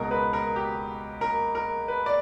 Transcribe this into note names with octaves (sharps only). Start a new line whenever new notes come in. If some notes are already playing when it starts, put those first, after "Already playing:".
Already playing: C#2 B2 A#4
B4
A#4
G4
A#4
A#4
B4
D5